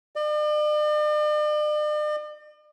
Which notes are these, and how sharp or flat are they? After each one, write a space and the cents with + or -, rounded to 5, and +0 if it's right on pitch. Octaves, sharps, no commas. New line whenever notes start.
D5 +45